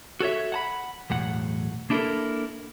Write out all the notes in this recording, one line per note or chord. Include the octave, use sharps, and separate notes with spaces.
F#4 A4 C#5 E5
F#5 A5 B5
B1 E2 A2 F#5
A#3 D4 E4 F#4 A4 A#4